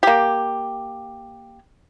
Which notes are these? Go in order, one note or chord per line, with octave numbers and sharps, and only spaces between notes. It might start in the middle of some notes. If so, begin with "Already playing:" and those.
A#3 G4